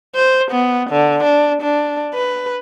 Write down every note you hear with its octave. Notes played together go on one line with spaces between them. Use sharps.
C5
B3
D3
D4
D4
B4